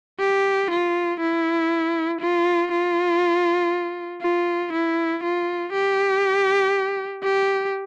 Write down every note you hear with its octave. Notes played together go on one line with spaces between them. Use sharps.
G4
F4
E4
F4
F4
F4
E4
F4
G4
G4